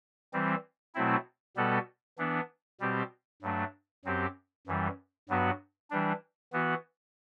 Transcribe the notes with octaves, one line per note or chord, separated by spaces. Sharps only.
E3 G3 C4
B2 F#3 A3 C4 E4
B2 G3 B3 F#4 A4
E3 B3 D4
B2 G3 C4 G4
G2 F#3 A3 D4
F#2 F#3 C4 G4
F#2 E3 G3
G2 F#3 B3 F#4
E3 G3 D4
E3 B3 F#4